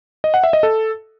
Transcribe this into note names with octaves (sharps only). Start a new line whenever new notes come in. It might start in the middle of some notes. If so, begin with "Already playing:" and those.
D#5
F#5
E5
D#5
A4